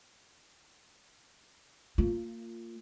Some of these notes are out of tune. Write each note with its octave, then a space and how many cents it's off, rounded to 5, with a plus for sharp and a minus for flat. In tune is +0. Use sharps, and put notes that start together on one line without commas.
A#3 -25 F4 -5